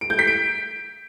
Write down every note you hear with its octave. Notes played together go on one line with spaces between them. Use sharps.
D7
G6
B6
D7